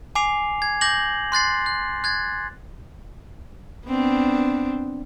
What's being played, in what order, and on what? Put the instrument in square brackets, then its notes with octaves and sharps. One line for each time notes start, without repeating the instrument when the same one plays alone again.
[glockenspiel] G#5 D6 C7 F7
G#6
D6 G6 A#6 F#7
C6 F#6 A6 C7
F#6
F#6 G#6 A6
[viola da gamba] B3 C4 D4